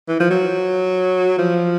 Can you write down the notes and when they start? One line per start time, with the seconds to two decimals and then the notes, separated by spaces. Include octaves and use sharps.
0.08 E3
0.20 F3
0.30 F#3
1.38 F3